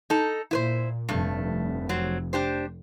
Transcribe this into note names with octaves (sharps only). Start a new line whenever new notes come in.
D#4 A4
A#2 E4 B4 C5
F1 G2 A3
F#3 C4
D4 G4 C5